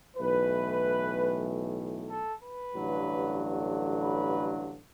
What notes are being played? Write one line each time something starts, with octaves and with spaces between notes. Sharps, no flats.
B1 A2 E3 B4
A4
B4
A1 G2 D3 F#3
B4